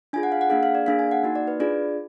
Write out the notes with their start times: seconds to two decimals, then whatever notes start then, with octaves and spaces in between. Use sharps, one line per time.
0.13 D4 F4 G#4 G#5
0.23 F#5
0.32 F5
0.41 F#5
0.50 A#3 D4 G#4 F5
0.63 F5
0.75 D5
0.86 A#3 D4 G#4 F5
0.99 G#5
1.11 F#5
1.23 A#3 D#4 F#4
1.35 D5
1.48 B4
1.60 D4 F4 G#4 D5